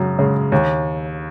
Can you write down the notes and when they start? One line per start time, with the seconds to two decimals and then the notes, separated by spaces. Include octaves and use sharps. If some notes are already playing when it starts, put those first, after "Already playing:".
Already playing: F#2 C#3 G#3
0.19 C#3 G#3
0.52 D#2